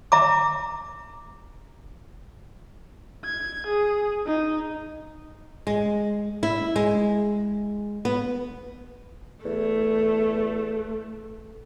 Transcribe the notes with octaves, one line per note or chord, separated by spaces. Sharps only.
E5 A#5 D6
G#6
G#4
D#4
G#3
E4
G#3
B3
E2 A3